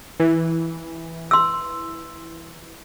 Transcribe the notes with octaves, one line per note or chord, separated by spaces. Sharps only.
E3
C6 E6